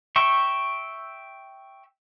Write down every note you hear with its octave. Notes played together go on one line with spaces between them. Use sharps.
E5 G5 C#6